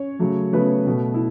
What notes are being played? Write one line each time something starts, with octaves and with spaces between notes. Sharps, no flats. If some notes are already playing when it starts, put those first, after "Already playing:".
Already playing: C#4 C#5
C#3 F#3 A3
C#3 F#3 A3 B3 B4
B2 A3
E4